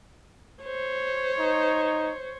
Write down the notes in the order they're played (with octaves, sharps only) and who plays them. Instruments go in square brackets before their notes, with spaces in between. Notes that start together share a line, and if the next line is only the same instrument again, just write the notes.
[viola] C5 C#5
[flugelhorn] D#4